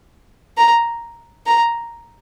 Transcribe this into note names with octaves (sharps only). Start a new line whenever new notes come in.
A#5
A#5